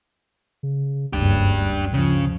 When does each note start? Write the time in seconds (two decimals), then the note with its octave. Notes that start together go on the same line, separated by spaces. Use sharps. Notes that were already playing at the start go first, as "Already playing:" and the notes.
0.63 C#3
1.13 F#1 D2 G2 D4 G4
1.94 C#3 F3